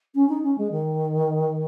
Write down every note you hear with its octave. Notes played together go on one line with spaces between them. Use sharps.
C#4
D#4
C#4
G#3
D#3